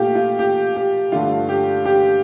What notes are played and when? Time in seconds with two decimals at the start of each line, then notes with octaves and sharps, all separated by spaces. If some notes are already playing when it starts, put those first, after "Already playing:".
Already playing: A#2 A3 F4 G4
0.15 F4
0.39 G4
0.76 G4
1.12 G2 D3 A3 F4
1.49 G4
1.85 G4